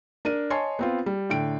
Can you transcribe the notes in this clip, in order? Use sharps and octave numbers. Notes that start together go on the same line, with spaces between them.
D4 A#4 D#7
C#5 D#5 G#5 A5 C6 C7
B3 C4 F4
G3
A2 D3 G5 D7